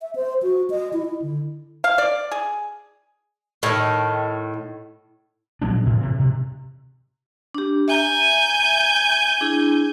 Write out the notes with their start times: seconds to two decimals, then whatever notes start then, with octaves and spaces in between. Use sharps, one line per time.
0.02 E5
0.16 C5
0.43 F#4
0.70 D#5
0.93 E4
1.05 E4
1.22 D3
1.84 F5
1.98 D5
2.32 G#4
3.63 A2 D#3
5.62 A#1 F#3 B3 D4
5.86 A2 C3
6.00 C3 E3
6.20 C3
7.55 D4 G4
7.88 E5 G#5 A#5 G6
9.41 D4 E4 G#4